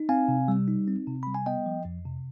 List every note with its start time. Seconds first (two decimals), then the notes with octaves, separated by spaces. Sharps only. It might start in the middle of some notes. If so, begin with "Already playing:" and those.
Already playing: D#4
0.09 C4 F5 G#5
0.28 C3
0.48 G3
0.68 D#4
0.88 C4
1.07 C3
1.23 G3 B5
1.35 G#5
1.46 B3 D#5 G5
1.66 F3
1.85 F2
2.05 C3